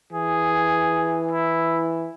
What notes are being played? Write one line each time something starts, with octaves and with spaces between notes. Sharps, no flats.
E3 G#4
E4